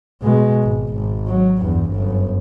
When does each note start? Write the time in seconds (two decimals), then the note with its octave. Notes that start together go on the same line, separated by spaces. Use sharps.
0.22 B2 G#3
0.64 G#1
0.94 G#1
1.27 F#3
1.59 E2 G2
1.92 G1 F#2